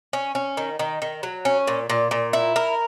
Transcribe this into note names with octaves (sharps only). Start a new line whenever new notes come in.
C#4
C#4
D#3
D#3
D#3
F#3
C#4
A#2
A#2
A#2
E4
A#4